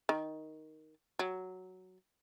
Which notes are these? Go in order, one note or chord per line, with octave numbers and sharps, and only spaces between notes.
D#3
F#3